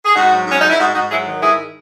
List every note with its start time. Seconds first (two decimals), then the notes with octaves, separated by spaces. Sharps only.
0.05 G#4
0.15 G#2 D#4 F#4
0.31 F#3
0.47 G#2 C#4
0.60 G#2 D#4
0.70 E4
0.79 G#2 D#4 F#4
0.95 G#2 D#4 F#4
1.10 F#3 E4 G#4
1.26 D#3
1.42 G#2 E4 G#4